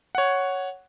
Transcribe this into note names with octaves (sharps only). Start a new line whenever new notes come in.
C#5 F#5